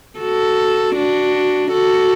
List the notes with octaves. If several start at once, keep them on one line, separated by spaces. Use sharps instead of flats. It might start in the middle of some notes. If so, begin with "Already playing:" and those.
F#4 A4
D4 F#4
F#4 A4